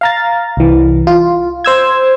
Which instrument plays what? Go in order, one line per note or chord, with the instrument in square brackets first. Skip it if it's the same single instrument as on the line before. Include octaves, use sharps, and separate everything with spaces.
[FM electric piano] F5 A#5 A6
C2 E3
F4
C5 E6 G#6